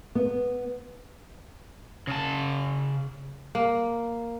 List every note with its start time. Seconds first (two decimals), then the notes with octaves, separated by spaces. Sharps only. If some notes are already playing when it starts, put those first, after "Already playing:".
0.15 B3
2.07 C#3 A5
3.55 A#3